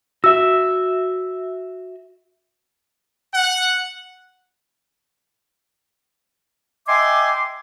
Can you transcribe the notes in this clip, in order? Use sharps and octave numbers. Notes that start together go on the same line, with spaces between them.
F#4 E5 E6
F#5
D#5 E5 G5 G#5 C6 D6